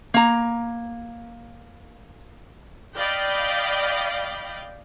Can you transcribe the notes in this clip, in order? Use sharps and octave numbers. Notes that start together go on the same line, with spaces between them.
A#3 A#5
D5 D#5 F5 G5 B5